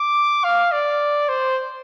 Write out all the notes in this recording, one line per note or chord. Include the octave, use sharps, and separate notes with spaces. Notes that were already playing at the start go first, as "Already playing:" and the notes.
Already playing: D6
F5
D5
C5